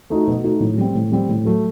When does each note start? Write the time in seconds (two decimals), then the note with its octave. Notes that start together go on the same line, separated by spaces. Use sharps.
0.10 A3 D#4 F#4
0.27 B2
0.44 A3 D#4 F#4
0.60 A2
0.78 G3 C4
0.95 A2
1.12 G3 C4
1.29 A2
1.45 F#3 A3